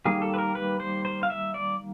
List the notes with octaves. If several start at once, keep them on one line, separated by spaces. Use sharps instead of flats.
D#3 G3 A#3 G#4
A4
B4
A#4
B4
C5
C5
F5
E5
D5